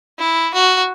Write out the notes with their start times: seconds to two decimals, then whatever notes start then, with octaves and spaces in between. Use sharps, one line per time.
0.18 E4
0.54 F#4